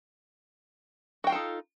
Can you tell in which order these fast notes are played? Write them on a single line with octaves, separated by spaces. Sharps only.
F#4 G5 F4 A4 D#4